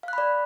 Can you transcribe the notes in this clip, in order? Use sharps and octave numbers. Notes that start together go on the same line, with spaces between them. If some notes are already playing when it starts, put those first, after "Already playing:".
D5 F5 B5 F#6